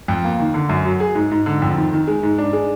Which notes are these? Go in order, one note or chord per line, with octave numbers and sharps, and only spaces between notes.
F2
A#3
D#3
D3
F#2
F#3
G#4
G#2
G#2
D3
F2
D#3
D#3
G#3
G#2
D4
G#3